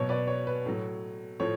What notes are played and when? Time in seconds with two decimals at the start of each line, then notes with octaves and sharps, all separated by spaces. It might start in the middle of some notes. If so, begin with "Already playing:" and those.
Already playing: B2 F#3 C#5
0.09 B4 D5
0.27 C#5
0.47 B4
0.66 A2 F#3
1.40 A2 F3 C#5